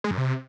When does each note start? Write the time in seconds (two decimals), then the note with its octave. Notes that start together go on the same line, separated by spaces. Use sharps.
0.04 G#3
0.11 F#2
0.18 C3